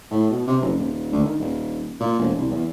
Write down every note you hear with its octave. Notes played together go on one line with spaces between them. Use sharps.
A2
B2
C3
F#1
D#1
D2
D#3
D#1
A#2
E1
C2
E2